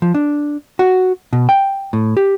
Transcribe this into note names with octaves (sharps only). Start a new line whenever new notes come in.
F3
D4
F#4
B2
G5
A2
G4